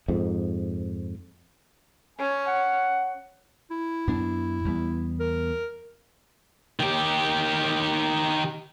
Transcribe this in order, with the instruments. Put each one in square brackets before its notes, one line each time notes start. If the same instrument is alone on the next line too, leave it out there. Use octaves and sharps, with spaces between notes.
[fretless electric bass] F2 G#2
[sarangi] C#4 [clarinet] G#5
[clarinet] F#5
E4
[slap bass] F#2 B3 D4
E2 G3 B3
[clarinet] A#4
[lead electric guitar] D#3 G4